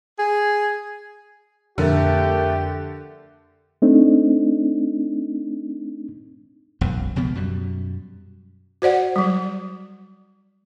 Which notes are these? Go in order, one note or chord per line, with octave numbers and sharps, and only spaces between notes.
G#4
F2 D3 A3 G4 A#4 A6
A3 C4 D4 D#4
E1 B1 F#2
C#2 B2 F3 B3
F#2 B2 G3
F#4 C5 D5 F#5
F#3 G3